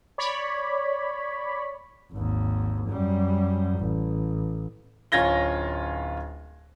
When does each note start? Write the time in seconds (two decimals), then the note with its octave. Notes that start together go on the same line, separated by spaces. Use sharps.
0.18 C#5 D5 B5
2.13 G#1 D#2
2.89 F#2 G3
3.79 A1
5.12 D1 C#4 F4 G#6 A#6 G7